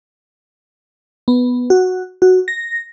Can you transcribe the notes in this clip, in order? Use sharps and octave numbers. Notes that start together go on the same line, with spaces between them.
B3
F#4
F#4
A#6